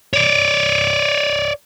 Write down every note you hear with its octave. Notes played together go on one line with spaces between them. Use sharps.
C#5 D5